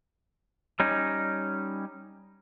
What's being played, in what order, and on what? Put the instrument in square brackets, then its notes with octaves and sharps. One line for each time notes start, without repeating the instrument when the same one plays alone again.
[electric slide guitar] G3 C#4 D#4